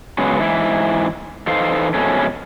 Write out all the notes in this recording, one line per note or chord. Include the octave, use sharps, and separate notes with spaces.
C#3 F#3 G#3 B3
G#2 E3 E4
E3 D#4 A4 C5 F5
F2 B2 G#3 A3 C#4